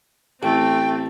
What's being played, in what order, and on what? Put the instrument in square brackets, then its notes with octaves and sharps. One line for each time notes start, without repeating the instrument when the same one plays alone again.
[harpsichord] A1 [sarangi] A3 [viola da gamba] C4 [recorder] G5